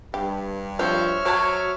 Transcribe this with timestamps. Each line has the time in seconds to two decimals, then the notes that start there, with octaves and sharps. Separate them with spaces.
0.14 G2 G4
0.79 F3 C4 D4 F#4 C#5 E5 F6
1.25 F#3 C5 A5